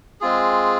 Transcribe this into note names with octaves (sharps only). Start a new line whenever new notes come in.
G#3 C4 F4 G#4